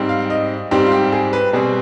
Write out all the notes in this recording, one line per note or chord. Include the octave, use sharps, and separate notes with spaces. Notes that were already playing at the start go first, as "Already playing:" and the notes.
Already playing: G#2 G3 C4
F5
D#5
G#2 G3 C4 G4
F4
G4
G4
G#4
B4
B2 G3 C4 G#4